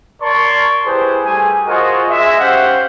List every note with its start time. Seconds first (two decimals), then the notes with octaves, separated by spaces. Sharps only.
0.21 A#4 C#5 D5 A5 C6 C#6
0.86 E4 G4 G#4 B4 C5
1.24 G3 A3 G#4 G#5
1.67 F4 F#4 G#4 A#4 C5 D#5
2.09 G#3 E5
2.40 C#4 G4 C5 F5 F#5